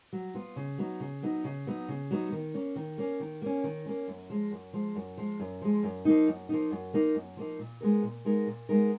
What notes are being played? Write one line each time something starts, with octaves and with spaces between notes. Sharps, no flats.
F#3
B3 F4
C#3
F#3 B3 D#4
C#3
F#3 B3 D#4
C#3
F#3 B3 D#4
C#3
F#3 B3 D#4
D#3
A#3 C#4
D#3
A#3 C#4
D#3
A#3 C#4
D#3
A#3 C#4
F#2
F3 G#3
F#2
F3 G#3
F#2
F3 G#3
F#2
F3 G#3
F#2
F3 A#3 D#4
F#2
F3 A#3 D#4
F#2
F3 A#3 D#4
F#2
F3 A#3 D#4
A#2
G#3 B3 D#4 A#4
A#2
G#3 B3 D#4 A#4
A#2
G#3 B3 D#4 A#4